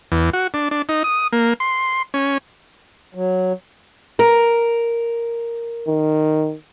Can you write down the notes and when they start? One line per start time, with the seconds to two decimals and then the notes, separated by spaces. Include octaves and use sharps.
0.12 E2
0.33 F#4
0.54 D4
0.71 D4
0.89 D#4
1.04 D#6
1.32 A#3
1.60 C6
2.14 C#4
3.15 F#3
4.19 A#4
5.87 D#3